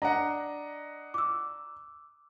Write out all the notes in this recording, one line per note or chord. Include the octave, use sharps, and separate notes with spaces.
D4 D#5 F#5 A#5
D6 E6